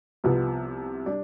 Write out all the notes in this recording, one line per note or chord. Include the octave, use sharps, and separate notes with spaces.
C2 C3 F3 B3
G3 D4